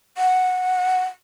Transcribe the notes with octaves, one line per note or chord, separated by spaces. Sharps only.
F#5